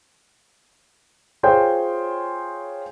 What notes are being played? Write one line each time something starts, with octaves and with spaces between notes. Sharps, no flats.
F4 G#4 C5 C#5 G5